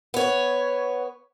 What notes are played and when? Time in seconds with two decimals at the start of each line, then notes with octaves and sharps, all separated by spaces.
0.14 B3 C#5